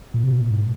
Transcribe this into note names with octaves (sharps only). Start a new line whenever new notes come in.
A#2
C3
B2
A#2
G#2